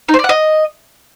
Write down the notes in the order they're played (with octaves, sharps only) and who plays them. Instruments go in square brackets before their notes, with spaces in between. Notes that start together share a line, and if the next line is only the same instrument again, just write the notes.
[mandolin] D#4
C5
D5
F#5
D#5